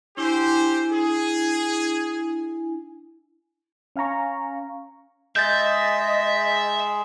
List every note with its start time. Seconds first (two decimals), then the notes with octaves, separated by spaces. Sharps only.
0.17 D4 E4 G4 C5 G#5
0.91 G#4
3.96 C#4 F5 G#5 A#5 C#6
5.36 G#3 G#4 D#5 E5 G6 A6